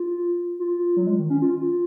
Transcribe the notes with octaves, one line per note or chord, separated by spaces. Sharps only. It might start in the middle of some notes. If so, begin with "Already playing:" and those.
Already playing: F4
F4
F#3
G#3
D#3
C#4
F4
F4